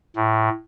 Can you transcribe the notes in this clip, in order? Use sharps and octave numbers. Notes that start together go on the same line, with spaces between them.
A2